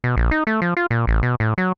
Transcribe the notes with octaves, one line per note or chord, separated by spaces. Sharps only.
B2
A#1
D#4
A3
F3
F4
A#2
A1
B2
A2
F#3